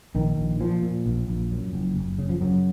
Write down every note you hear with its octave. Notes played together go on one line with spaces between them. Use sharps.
A#1 D#3
A#1
A#2 F3
A#2
A#1
A#1
F#2
F#1
F#1
C#3
F3
F#2 F#3